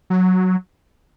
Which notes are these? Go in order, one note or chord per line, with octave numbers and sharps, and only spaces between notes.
F#3